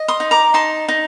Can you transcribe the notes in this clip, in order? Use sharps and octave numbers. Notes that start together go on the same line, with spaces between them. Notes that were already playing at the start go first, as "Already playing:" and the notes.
Already playing: D#5
C6 D#6
D#4
A#5 D6
D#4 A5 C6
D#4